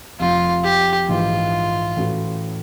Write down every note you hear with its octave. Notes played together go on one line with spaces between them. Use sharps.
F1 F2 C3 F3 F4
G4
A#1 G#2 E3 F4
A2 E3 A3 C#4 F#4